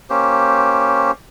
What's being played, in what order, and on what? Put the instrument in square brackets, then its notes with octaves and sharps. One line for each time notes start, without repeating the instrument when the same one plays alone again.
[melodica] A#3 C#4 G4 C5